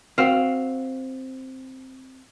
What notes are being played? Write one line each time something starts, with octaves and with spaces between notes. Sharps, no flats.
C4 F#4 F5